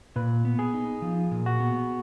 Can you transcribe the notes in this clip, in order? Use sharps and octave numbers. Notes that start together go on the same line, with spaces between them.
A#2 B4
B3
G#4
D#4
F3
A#2
F#4
B3